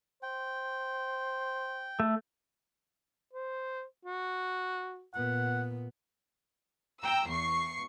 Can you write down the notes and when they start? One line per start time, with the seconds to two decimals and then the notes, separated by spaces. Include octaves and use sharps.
0.23 C5 G5
2.00 A3
3.33 C5
4.05 F#4
5.14 A#2 B3 F#5
7.00 G5 A#5 E6
7.29 E2 C#6 C7